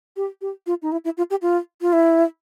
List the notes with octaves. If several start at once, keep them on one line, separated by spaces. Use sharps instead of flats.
G4
G4
F4
D#4
E4
E4
F4
G4
F4
F4
E4